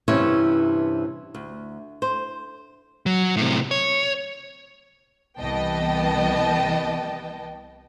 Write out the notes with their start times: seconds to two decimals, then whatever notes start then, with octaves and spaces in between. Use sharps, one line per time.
0.08 G2 C3 E3 C#4 E4 C#5
1.35 D2
2.02 C5
3.06 F#3
3.37 A2 C3
3.71 C#5
5.39 C2 E3 B3 D#5 G5 A5